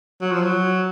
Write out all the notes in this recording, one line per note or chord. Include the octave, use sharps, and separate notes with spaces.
F#3
F3
F#3